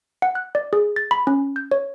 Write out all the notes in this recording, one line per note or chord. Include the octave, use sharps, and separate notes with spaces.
F#5
F#6
D5
G#4
A6
B5
C#4
G6
C#5